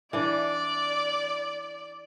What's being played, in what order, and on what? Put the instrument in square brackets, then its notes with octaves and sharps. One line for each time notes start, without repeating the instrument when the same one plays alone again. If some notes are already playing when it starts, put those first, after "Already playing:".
[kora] E3 D4 [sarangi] D5